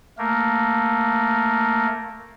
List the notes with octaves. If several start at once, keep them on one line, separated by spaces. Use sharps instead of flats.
A3 A#3 A#4